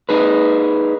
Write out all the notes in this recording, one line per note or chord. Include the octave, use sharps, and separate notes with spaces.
D#4 G#4 B4